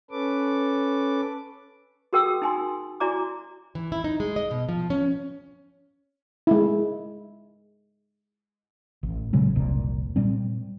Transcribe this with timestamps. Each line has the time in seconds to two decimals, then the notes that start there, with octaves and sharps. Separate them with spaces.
0.11 C#4 A4 B4 D6
2.13 F#4 G#4 A#4 G5 D#6 E6
2.42 D#4 G#5 C6
3.00 E4 F#4 D5 G#5 A#5 D6
3.75 E3
3.92 E4
4.04 D#4
4.20 G#3
4.36 D#5
4.51 B2
4.69 F3
4.90 C#4
6.47 G#3 E4
9.03 A1
9.33 A#2 C#3 F#3 G#3
9.55 F1 C2 A#2
10.16 A#2 G3 C4